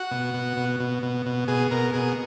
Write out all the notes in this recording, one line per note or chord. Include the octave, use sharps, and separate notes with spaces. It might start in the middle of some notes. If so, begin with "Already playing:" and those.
Already playing: F#4
B2
B2
B2
B2
B2
B2
B2 G#4
B2 A#4
B2 G#4